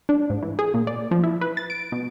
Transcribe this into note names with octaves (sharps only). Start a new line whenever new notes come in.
D4
G#2
E3
G#4
A#2
D5
F3
E4
B4
A6
D7
B2